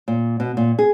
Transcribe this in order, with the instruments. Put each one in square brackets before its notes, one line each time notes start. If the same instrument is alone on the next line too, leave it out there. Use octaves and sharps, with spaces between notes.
[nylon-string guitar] A#2
B2
A#2
G#4